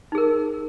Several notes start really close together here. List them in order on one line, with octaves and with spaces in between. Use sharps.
D#4 G#4 A#4